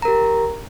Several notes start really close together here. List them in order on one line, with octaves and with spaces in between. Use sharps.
A#5 A#4 G4